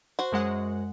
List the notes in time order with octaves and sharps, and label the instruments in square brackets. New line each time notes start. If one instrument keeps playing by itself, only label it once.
[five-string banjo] F#4 C5
[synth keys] F#2 G#3 F#5